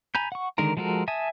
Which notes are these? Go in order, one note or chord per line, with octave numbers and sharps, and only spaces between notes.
G#5 A#5 B5 G6
F#5 C#6
D3 D#3 G#3 A#4 A#5
F3 G#3 F#4 A4 A#4
E5 G#5 A5 D#6